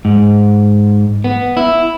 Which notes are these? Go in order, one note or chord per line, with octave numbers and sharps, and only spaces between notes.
G#2
B3
E4